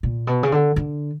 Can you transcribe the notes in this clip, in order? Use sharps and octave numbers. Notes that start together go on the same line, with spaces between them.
A#2
B2
C#3
D3
D3